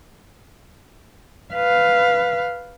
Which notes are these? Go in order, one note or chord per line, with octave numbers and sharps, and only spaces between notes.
B4 F5